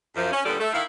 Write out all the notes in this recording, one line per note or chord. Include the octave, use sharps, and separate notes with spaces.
F#2 F3
C#4
A#2 D3 G3 B3 A4 D5
A3
D#3 E4 F5